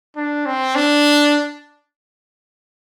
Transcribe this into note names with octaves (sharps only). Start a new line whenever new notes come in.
D4
C4
D4